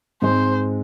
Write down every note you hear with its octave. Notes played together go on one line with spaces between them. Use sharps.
G#2 G#3 C4 C5